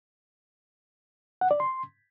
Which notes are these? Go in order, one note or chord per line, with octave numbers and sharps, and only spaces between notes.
F#5
D5
C6